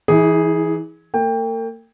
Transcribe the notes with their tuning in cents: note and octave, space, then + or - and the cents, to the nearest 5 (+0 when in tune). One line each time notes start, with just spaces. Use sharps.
E3 +5 E4 -45 G#4 +0
A#3 -45 G5 +20